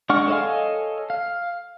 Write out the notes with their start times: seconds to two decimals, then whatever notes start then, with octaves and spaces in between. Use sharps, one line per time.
0.10 G#3 D4 F#5 C#6 F6
0.28 A4 C#5 D#5 F5 G#5
1.10 F5